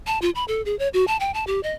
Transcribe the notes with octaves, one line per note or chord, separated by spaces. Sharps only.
A5
F4
B5
A4
G#4
C#5
F#4
A5
G5
A5
G4
D#5